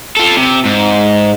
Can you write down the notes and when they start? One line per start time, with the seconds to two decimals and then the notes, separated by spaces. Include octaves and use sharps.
0.17 F4 A4
0.36 C3
0.65 G#2